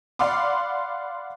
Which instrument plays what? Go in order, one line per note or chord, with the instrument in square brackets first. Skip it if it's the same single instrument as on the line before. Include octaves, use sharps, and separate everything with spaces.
[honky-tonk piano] D5 F5 F#5 B5 C6 D6